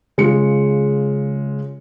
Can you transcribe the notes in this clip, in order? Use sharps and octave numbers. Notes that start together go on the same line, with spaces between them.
C#3 G#3 F4 C#7